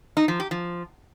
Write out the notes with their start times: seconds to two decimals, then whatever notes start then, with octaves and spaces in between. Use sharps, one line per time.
0.17 D#4
0.28 F3
0.40 G4
0.51 F3